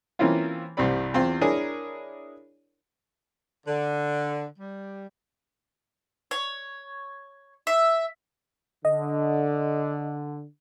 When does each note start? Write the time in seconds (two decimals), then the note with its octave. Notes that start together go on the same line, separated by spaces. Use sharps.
0.19 E3 A#3 C4 C#4 E4 F4
0.77 C2 G2 G3 C4 D5 B5
1.14 E2 C4 F4 C6
1.41 D4 E4 G#4 A#4 C#5
3.67 D3
4.58 G3
6.31 C#5
7.67 E5
8.85 D3 D#5